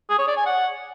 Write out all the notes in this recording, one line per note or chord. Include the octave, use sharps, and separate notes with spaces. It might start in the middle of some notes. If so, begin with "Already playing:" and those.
G#4
C#5
D5
G#5
F#5